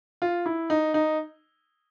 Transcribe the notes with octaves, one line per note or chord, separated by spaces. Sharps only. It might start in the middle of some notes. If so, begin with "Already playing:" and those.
F4
E4
D#4
D#4